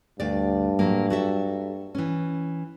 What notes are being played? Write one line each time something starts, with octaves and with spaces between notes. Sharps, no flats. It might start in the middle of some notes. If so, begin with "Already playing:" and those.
D2 G2 D5
A2 F#3 A#3
F#4 A4 E5
E3 C#4